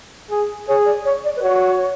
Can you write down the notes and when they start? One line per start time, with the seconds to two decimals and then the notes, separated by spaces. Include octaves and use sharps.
0.30 G#4
0.68 G#4 C#5
0.86 D5
1.05 C#5
1.24 D5
1.36 B4
1.42 F#4 C#5